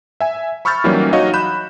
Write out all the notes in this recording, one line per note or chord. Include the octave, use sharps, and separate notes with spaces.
E5 G#5
B5 C#6 E6 F6 G6 A6
E3 F#3 G3 A#3 C#4 D#4
D#4 F#4 C#5 D#5 F5
B5 F#6 G6 E7